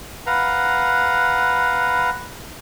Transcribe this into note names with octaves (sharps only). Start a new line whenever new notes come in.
B4 F5 F#5 A#5